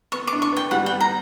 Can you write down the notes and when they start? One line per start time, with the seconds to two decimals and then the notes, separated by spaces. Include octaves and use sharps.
0.12 B3 C#6
0.27 D6
0.33 D4
0.42 C#6
0.52 B3 G5
0.71 G3 F#5
0.86 G5
0.92 B3
1.00 A#5